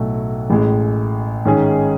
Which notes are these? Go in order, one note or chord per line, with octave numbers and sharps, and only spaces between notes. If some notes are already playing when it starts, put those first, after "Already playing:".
Already playing: B1 A2 F#3 A3
A1 A2 G#3
G#2 D#3 G#3 C#4 G#4